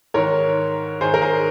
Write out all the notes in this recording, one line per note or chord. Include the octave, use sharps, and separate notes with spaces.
G#2 D#3 A#4 C#5
G#2 D#3 G#4 C5
A#4
G#4 C5